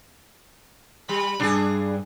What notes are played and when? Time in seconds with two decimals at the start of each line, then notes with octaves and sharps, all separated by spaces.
1.09 G3 B5
1.40 B1 G2 D4 G#4